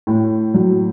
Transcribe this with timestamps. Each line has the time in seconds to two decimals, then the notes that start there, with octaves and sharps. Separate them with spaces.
0.07 A2
0.54 F#3